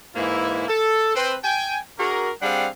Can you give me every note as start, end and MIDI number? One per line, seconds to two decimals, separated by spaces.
0.16 0.65 44
0.16 0.65 52
0.16 0.65 56
0.16 0.65 58
0.16 0.65 64
0.68 1.14 69
1.16 1.34 60
1.16 1.34 71
1.16 1.34 72
1.44 1.77 79
1.44 1.77 80
1.99 2.30 62
1.99 2.30 66
1.99 2.30 68
1.99 2.30 70
2.42 2.66 55
2.42 2.66 60
2.42 2.66 62
2.42 2.66 68
2.42 2.66 77
2.42 2.66 78